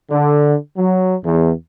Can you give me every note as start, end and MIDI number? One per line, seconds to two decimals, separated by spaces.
0.11 0.55 50
0.77 1.15 54
1.23 1.52 40